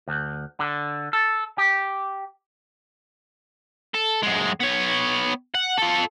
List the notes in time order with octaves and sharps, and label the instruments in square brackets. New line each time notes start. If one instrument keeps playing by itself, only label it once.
[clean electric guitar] D2
D3
A4
G4
[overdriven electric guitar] A4
F#2 G#3
B3 C#5
F#5
F4 A4